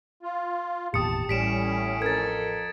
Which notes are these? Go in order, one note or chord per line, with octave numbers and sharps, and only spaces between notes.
F4
G#1 E2 A#2 G4 A5 D#6 C#7
A1 A2 G3 C#4 B6 D7 E7
F2 A4 A#4 G#6 A6